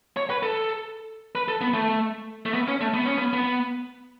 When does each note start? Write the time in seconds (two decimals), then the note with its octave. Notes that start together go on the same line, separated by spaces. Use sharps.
0.17 C#5
0.30 B4
0.43 A4
1.35 B4
1.48 A4
1.61 B3
1.74 A3
2.46 A3
2.54 B3
2.68 C#4
2.81 A3
2.94 B3
3.06 C#4
3.17 B3
3.33 B3